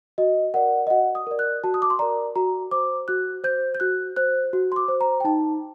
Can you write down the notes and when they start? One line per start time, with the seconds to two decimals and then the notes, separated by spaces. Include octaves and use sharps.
0.18 F#4 D#5
0.54 A#4 D5 F#5
0.87 D#5
0.90 F#4 F#5
1.15 D#6
1.27 A#4 D5
1.39 F#6
1.64 F#4 A5
1.74 D#6
1.82 D6
1.90 C6
1.99 A#4 D5 A#5
2.36 F#4 A#5
2.71 C5 D6
3.08 F#4 F#6
3.44 C5 G6
3.75 G6
3.80 F#4 F#6
4.16 C5 F#6
4.53 F#4
4.72 C6
4.76 D6
4.88 C5
5.01 A#5
5.20 G5
5.25 D#4 A5